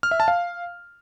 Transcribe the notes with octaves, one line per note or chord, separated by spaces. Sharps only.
F6
E5
A5
F5